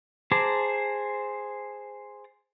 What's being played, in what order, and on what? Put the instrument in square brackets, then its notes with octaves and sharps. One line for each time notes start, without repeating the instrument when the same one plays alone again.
[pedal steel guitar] G#4 C5 A5 A#5 D6